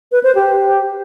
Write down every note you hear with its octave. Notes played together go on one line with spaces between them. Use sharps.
B4
C5
G4